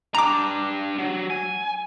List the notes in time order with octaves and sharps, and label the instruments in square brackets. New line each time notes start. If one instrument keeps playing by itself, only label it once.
[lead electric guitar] D4 G4 [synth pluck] A#5 D6
[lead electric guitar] F#3
G#5